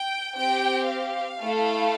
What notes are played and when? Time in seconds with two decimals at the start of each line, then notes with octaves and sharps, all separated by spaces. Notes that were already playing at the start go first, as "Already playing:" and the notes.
Already playing: G5
0.37 C4 G4 G5
0.89 F5
1.42 A3 E4 A4